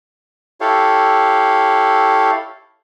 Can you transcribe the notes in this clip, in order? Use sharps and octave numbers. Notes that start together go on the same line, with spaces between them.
E4 G4 A4 C#5 F5